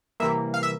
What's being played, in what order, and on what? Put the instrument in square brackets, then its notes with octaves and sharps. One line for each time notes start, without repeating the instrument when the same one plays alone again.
[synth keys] C3 E3 G3 A#3 E5
F5
E5